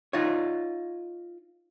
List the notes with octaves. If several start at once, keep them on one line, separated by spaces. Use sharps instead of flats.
D#4 F4 C#5